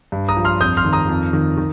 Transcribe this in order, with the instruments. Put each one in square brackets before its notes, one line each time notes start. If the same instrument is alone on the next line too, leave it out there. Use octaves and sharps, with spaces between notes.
[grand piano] G2
A#5 D#6
F3
C6 F6
F2 D#6 G6
C6 F6
D#3
A#5 D#6
F2
D#3
D#3